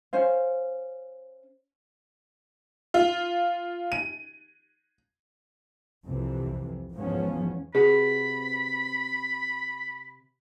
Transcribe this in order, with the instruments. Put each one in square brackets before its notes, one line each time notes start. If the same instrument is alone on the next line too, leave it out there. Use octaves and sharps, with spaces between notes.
[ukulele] C#4 C5 F5
[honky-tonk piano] F4
D#7
[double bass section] C2 F2 C3 E3
E2 G#2 F3 B3 C#4
[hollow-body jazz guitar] C3 F#4 B4 [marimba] G#4 [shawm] B5